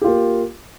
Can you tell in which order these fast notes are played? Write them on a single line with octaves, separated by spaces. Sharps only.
G4 F4 A#3